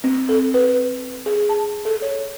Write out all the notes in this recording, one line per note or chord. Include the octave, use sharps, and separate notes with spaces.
C4
A4
B4
G#4
A5
A4
C#5